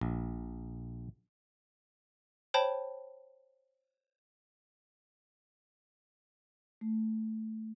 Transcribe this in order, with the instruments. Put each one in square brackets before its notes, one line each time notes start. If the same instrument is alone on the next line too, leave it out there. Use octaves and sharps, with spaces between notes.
[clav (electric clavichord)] A#1
[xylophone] C5 C#5 G5 A5 B5
[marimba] A3